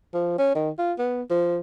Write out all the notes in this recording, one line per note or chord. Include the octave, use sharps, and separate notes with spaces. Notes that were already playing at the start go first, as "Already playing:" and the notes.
F3
C#4
D#3
F4
B3
F3